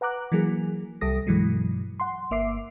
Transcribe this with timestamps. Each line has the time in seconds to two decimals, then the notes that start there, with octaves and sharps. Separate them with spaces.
0.01 B4 F#5 A#5 D6 F#6
0.32 E3 F#3 A#3 G#4
1.01 C2 G3 A4 D#6 A#6
1.27 G2 B2 E3 F#3 G#3
2.00 F#5 C6
2.31 G1 A#3 E5 D6 C7